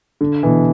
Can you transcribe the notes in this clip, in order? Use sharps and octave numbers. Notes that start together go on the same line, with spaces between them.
D3
B2 E3